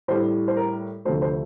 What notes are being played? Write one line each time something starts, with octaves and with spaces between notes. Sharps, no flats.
A2 G3 C5
C5
A#4
D2 C3 F3 A3 C5
C5